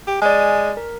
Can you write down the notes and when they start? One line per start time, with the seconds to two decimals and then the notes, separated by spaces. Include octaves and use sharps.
0.07 G4
0.22 G#3 D5 G#5
0.77 A#4